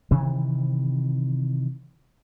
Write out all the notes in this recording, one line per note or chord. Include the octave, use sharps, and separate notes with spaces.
C3 D#3 E3